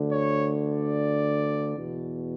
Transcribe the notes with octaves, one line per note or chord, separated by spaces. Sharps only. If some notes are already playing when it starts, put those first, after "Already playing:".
Already playing: D2 D3
C#5
D5
E2 B2